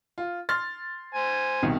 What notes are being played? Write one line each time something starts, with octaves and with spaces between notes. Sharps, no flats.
F4
C6 F6 A6
C5 G#5
C2 B2 D#3